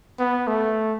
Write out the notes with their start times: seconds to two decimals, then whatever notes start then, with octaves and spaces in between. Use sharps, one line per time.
0.19 B3
0.47 A3